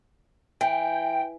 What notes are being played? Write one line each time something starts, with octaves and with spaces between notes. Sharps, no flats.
E3 G5